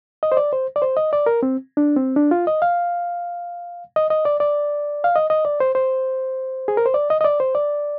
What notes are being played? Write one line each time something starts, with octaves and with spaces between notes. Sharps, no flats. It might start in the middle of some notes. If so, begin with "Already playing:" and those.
D#5
C5
D5
C5
D5
C5
D#5
D5
A#4
C4
D4
C4
D4
F4
D#5
F5
D#5
D#5
D5
D5
F5
D#5
D#5
D5
C5
C5
G#4
A#4
C5
D5
D#5
D#5
D5
C5
D5